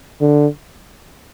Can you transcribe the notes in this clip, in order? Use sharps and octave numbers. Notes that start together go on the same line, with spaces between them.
D3